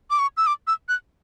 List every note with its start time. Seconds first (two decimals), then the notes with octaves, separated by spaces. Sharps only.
0.10 D6
0.19 C#6
0.37 E6
0.47 D6
0.67 E6
0.89 F#6